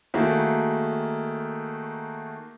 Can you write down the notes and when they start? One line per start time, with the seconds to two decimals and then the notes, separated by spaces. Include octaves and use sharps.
0.14 D#3 A3 A#3 F#4 G#4